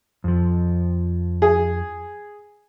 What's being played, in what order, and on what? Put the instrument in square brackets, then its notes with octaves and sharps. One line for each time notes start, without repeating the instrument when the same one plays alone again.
[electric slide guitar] F2 F3
[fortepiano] G#4